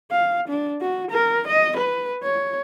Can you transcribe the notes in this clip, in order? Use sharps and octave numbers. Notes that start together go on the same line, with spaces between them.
F5
D4
F#4
A#4
D#5
B4
C#5